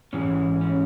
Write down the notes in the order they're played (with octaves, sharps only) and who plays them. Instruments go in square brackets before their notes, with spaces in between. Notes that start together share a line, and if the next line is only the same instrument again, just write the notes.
[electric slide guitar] G#2 E3 G#3 C#4
C#4